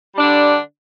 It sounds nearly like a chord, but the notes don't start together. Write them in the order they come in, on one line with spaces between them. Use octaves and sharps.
G3 D4 D3